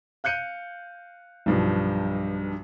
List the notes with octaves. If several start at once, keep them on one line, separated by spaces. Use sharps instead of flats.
F5 F#6 G6 C#7 D#7
B1 G2 F3